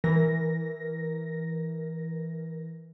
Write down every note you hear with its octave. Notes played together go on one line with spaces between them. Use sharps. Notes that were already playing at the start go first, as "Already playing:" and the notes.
E3 A#4 A#6